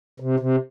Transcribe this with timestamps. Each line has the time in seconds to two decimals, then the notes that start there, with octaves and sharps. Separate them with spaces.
0.20 C3
0.40 C3